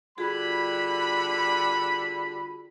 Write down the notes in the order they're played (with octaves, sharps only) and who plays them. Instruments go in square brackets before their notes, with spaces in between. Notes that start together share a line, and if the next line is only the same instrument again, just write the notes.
[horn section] D3 G3 B5 [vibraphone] F4 F#4 G#4